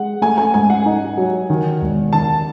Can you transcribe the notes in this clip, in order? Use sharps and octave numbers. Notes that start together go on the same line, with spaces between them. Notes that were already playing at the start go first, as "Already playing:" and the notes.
Already playing: G#3 F#5
A3 G#5
G#5
G#2 G#5
F#5
D#4
F#3
D#3
E1
D#3 A5